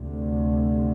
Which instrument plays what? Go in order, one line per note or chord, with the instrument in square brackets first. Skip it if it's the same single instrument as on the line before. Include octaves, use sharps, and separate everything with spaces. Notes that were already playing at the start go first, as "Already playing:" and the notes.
Already playing: [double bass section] D2 C3